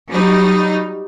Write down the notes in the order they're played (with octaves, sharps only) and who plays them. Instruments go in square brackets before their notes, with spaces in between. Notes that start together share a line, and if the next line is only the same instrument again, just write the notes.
[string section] F#3 G3 D#4